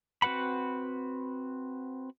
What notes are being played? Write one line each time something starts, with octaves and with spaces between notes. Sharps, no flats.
C4 F#4 B4 F#5 B5